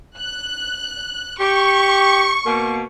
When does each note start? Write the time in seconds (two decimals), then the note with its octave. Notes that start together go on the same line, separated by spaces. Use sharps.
0.18 F#6
1.39 G4 C#6
2.45 B2 A#3